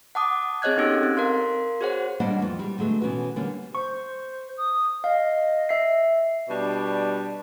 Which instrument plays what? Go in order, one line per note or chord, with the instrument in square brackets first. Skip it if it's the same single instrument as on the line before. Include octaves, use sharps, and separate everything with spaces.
[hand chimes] F#5 A5 D6 D#6
C4 G#4 C#5 D#5 F#6 G#6
B3 C#4 D#4 G4 A4 E6
C4
A#4 F5 C6
F#4 G#4 C5 C#5 F#5
[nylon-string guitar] G3 A#3 D4 C5 D#5 F#5
F2 E3
G3 G#3
D3 F#3 G#3 A3 B3
B2 E3 C#4 F#4 B4
D3 G3 A#3 C#4
[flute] C5 [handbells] C#6
[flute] D#6
[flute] D#5 [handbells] F5
[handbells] E5 B6 C7
[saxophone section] B2 G3 D4